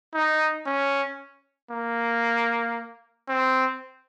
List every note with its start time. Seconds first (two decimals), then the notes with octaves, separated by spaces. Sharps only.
0.14 D#4
0.66 C#4
1.71 A#3
3.29 C4